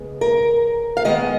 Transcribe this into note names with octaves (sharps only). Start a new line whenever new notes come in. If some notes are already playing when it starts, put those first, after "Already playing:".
Already playing: C#3 G#3 B3
A#4
F5
D#3 G#3 B3 D#5